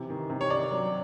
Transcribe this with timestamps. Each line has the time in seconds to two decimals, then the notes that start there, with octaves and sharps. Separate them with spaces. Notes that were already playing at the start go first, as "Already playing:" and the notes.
Already playing: C3 E3
0.10 D#3
0.30 C3
0.41 C#5
0.50 D4 D5
0.71 F#3